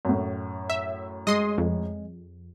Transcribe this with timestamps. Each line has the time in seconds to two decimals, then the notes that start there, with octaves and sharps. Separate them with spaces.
0.05 F#2 A2
0.70 E5
1.27 G#3 D#5 C6 D#6
1.58 F2